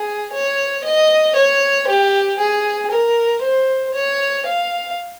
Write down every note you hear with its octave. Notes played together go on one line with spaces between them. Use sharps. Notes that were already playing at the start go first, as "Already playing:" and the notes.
Already playing: G#4
C#5
D#5
C#5
G4
G#4
A#4
C5
C#5
F5